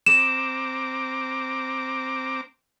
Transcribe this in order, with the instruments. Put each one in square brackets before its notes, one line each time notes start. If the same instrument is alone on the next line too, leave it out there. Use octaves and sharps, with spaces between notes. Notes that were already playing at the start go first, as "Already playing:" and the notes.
[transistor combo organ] C4 A#5 D6 [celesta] E7